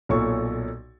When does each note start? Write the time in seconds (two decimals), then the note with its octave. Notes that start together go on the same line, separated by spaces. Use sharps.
0.09 B1 A#2 A4 C#5 C#6